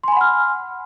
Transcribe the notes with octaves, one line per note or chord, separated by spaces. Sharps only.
F#5 G#5 B5 C6 F6